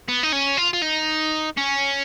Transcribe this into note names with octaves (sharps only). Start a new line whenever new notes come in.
B3
D#4
C#4
F4
F4
D#4
C#4